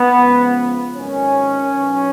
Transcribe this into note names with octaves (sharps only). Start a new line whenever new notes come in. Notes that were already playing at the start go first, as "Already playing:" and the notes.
Already playing: B3
C#2 C#3 F3
G#1 F#2 D#3 C#4
B1 B2 F#3